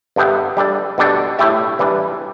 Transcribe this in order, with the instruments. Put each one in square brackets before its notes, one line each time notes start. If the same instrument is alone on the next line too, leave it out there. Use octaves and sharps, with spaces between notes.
[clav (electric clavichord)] G2 D3 B3 G4 E5
G3 D4 A4 D5
B2 G3 D4 A4 D5
A2 A3 E4 G4 E5
E3 G3 D4 B4 D5